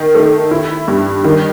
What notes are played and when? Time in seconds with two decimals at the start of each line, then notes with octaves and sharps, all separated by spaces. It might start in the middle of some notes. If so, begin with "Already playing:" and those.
Already playing: D#3
0.15 A3
0.51 E4
0.88 G2
1.25 D#3